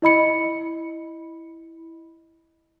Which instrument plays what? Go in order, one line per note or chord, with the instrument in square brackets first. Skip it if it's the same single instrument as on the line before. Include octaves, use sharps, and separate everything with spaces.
[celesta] E4 D#5 B5 C#7